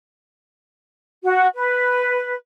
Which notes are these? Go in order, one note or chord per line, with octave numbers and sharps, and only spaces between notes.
F#4
B4